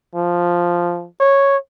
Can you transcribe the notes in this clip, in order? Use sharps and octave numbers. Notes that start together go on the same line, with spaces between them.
F3
C#5